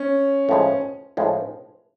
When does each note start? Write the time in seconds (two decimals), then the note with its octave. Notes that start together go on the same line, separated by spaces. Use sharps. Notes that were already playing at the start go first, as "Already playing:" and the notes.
Already playing: C#4
0.49 A2 F3 G#3
1.17 A2 F3 G#3